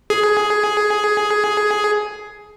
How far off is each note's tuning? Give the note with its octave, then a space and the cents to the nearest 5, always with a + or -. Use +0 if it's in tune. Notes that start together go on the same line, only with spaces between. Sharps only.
G#4 +10